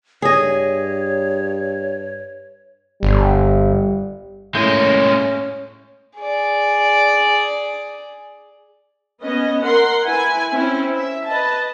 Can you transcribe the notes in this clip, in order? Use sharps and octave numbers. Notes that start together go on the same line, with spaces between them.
G2 G#4 C#5 D#5
G1 G3
A2 G#3 A#3 C#4 G6
G#4 D5
B3 C#4 D#5
A#4 F#5 C6
E4 B4 G#5
C4 C#4 E4
E5
B4 D#5 A5